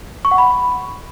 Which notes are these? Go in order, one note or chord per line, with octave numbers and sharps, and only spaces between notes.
C#6
F#5
B5